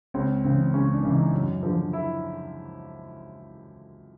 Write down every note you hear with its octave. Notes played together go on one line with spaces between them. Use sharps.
C#2 C4
C#3 E3 C4
C#2 C#4
D4
C#3 E3
D#4
F#2
D3 F3
E4